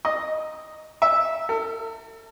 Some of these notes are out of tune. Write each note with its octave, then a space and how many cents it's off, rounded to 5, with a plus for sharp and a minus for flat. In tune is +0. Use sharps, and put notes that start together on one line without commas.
D#5 +0
E5 -10
A4 +40